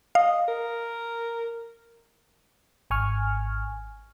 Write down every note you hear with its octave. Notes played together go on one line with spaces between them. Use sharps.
D#5 F5
A#4
G#1 G#5 C#6 F6